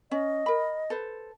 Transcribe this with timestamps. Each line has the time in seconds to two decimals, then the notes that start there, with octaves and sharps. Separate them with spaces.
0.11 C#4 D#5
0.46 A#4 B5
0.90 A4 B4 C5